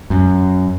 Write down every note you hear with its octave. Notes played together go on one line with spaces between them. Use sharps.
F#2